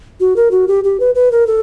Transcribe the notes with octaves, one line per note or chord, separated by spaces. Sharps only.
F#4
A#4
F#4
G4
G4
B4
B4
A#4
A4